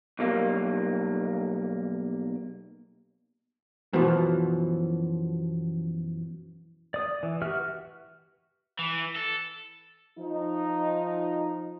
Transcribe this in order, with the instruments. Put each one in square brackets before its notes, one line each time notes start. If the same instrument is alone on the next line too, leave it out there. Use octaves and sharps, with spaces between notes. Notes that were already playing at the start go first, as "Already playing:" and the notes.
[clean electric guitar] B1 G3 A#3
[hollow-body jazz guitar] F#2 B2 E3 F3
[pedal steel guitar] D5 D#6
E3
F#4 G4 B4 E5 F6
[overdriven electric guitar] E3
A4
[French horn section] F3 D#4